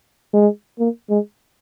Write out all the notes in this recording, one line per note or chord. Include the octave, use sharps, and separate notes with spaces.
G#3
A#3
G#3